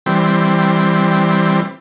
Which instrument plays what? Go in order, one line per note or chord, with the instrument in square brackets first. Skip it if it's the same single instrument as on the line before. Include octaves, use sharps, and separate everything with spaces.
[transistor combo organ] E3 G3 C4